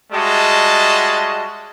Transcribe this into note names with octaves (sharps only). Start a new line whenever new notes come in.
G3 G#3 F#4 D#5 E5 A5